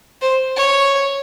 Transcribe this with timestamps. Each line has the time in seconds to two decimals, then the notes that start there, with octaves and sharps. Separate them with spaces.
0.22 C5
0.57 C#5